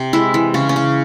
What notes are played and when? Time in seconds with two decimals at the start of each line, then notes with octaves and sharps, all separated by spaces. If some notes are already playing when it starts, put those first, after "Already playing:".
Already playing: C3
0.13 G#3 E4
0.34 E3
0.54 C#3 C#4
0.69 C#4
0.76 C#3